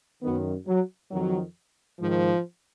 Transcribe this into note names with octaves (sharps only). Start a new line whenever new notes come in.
F#2 D#3 B3
F#3
F2 D#3 F#3
G#2 D#3 F3